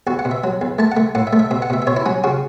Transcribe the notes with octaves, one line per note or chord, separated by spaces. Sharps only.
E2 F#4
F#5
B2
E5
F#3
E2
A3 A5
F#5
A3
A2 F#5
E5
A3
E5
B2 E5
F#5
B2 E5
E5
B2 C#5
E4
F#3 C#4
C#3 F#4